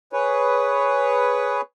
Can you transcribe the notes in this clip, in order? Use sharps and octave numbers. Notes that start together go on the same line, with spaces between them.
G#4 B4 C#5